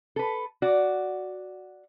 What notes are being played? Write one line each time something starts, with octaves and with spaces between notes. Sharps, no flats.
A4 B4
F#4 D5